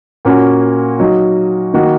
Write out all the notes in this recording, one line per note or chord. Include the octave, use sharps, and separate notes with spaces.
A#2 A#3 C#4 F#4
F#3 D#4 F#4
D#3 A#3 D#4 F#4